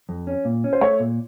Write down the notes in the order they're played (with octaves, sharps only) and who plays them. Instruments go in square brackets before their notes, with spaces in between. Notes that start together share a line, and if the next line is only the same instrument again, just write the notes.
[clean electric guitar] F2
C#4
A#2
C#4
[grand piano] C5
[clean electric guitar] A3 [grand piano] C#5
[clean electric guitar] A#2